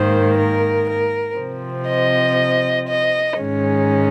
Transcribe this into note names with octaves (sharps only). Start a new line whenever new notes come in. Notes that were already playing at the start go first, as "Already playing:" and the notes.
Already playing: G#2 D#3 A#3 C5
A#4
A#4
C3 F3 C4
D#5
D#5
G#2 D#3 G#3 C#4